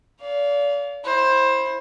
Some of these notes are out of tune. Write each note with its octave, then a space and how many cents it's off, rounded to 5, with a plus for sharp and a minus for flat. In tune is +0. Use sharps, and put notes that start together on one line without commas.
D5 -35 F5 +0
E4 +0 C5 +20